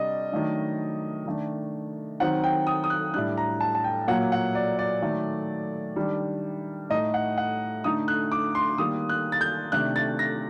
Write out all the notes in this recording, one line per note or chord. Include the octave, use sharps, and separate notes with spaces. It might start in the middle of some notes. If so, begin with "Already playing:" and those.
Already playing: C3 G3 D4 D5 D#5
D#3 F#3 A3 D4
D#3 A3 D4
D#3 F#3 C4 D#4 F#5
G5
D#6
D#6
F#6
A2 G3 D4 F#6
A#5
A5
A5
G5
A#2 F#3 A#3 F#5
F#5
D5
D5
D#3 F#3 A3
D#3 G3 D4
A2 A3 D#4 D#5
F#5
F#5
D3 A3 D#4 D#6
F#6
D6
C6
D#3 G3 A#3 D#6
F#6
A6
G6
C3 D#3 A3 D4 F#6
A6
A#6